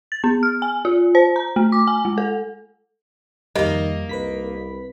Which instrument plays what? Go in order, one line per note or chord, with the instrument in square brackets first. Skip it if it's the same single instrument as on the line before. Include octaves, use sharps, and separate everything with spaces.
[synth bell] A6
B3
F6
G#5
F4
C5
A#5
A3
D6
G#5
G#3
A4
[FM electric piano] F2 G3 [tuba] D#3 [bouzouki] A#3 D#4 [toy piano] D#5
[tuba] C2 [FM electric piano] B4 B5 B6